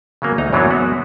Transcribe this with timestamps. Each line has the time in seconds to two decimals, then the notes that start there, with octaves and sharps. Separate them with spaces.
0.22 C#3 F#3 A#3 B3
0.38 D2 D#4 D#5 A#5
0.53 F#2 E3 F#3 B3 D4 D#4
0.70 G#3 B3 F#4